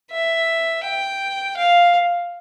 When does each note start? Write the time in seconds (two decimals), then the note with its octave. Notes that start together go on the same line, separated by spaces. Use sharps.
0.11 E5
0.84 G5
1.57 F5